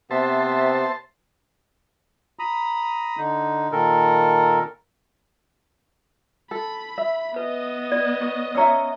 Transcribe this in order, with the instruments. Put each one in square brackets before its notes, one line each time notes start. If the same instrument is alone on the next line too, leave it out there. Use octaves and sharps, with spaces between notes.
[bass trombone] C3 [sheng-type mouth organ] B3 E5 [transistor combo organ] C5 A5
[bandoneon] A#5 B5 D#6
D3 D#4
A#2 D#3 A4 A#4
[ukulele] A4 [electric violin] B5
[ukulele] E5
[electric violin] B3 D#5 [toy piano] B4
[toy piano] D5
[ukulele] C#5
[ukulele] C#4 C#5 E5 [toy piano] A#5 E6